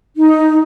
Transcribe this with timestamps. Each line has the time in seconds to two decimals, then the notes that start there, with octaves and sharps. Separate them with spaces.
0.16 D#4